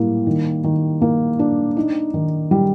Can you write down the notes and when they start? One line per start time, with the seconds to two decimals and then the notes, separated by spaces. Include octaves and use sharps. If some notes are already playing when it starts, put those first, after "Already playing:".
Already playing: A2 G3 A#3
0.27 D#3
0.64 D#3
1.01 A#3
1.39 D4
1.77 D#4
2.14 D#3
2.51 G3